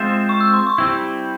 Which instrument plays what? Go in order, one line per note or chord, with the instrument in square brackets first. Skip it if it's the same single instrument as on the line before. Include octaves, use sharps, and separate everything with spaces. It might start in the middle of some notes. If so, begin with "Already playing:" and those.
Already playing: [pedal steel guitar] G#3 C4 F4 C5 E5
[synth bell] C#6
E6
C6
C#6
[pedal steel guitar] G3 C4 E4 [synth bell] E6